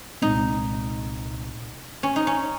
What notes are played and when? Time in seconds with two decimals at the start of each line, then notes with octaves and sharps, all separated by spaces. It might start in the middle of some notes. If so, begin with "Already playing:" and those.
0.22 C2 A#2 G#3 C4 D#4
2.03 C#4
2.16 D#4
2.27 C#4